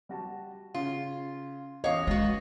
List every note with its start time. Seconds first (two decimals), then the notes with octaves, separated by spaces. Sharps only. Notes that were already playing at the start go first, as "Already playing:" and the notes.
0.09 G3 F#4 A5
0.74 C#3 F4
1.84 E2 C#4 C#5 D#5 F5 C#6
2.07 G#3 B3 D#4 F#4